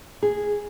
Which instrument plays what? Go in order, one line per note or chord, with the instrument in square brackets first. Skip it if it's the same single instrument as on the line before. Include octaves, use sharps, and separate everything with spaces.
[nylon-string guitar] G#4